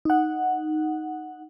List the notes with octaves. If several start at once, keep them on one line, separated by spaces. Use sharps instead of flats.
D#4 F#5